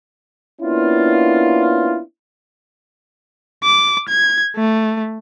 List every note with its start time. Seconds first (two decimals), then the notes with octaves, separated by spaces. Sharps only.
0.61 A#3 B3 C#4 D4 E4 F4
3.64 D6
4.08 G#6
4.56 A3